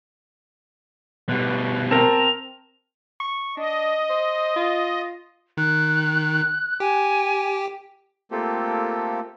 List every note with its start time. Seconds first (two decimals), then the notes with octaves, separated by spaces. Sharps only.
1.29 B2 G3 B4
1.91 C4 A#4 A5 A#5 F7
3.20 C#6
3.57 D4 D#5
4.09 C5
4.56 F4
5.57 D#3 F#6
6.80 G4 G#5
8.31 A3 A#3 C4 F4 G4 A4